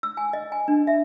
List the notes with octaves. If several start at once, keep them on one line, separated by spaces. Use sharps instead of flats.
E6
G#5
D#5
G#5
D4
E5